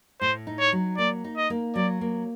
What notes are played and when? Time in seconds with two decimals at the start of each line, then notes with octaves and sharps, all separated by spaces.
0.21 A2 C5
0.47 D#4
0.60 C#5
0.72 F#3
0.98 A#3 D5
1.24 D#4
1.37 D#5
1.50 A#3
1.75 F#3 D5
2.01 A#3